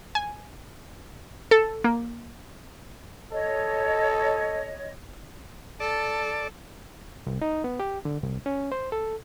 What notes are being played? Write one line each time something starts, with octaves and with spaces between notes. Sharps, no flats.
G#5
A4
A#3
A4 C#5 D#5
A4 D5
C2
D#4
B3
G4
D3
C2
C#4
C5
A4